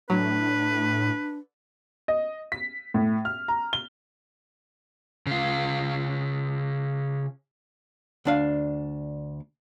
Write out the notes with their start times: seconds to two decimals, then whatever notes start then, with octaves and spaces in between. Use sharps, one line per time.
0.10 A2 F#3 D4 B4
2.08 D#5
2.52 B6
2.94 A2
3.25 F6
3.48 A#5
3.73 G7
5.27 C#3 F4
8.25 D2 D4 F5